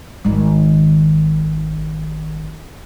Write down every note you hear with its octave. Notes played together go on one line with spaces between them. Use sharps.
G#1 D#3